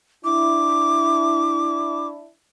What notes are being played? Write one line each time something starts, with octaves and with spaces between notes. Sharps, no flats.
D4 E4 D6